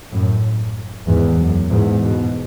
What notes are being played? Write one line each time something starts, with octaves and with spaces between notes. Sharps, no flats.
F#2 A2
E2 G#2
F#2
E2 G#2
G#2 B2